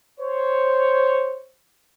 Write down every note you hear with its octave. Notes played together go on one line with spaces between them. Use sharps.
C5 C#5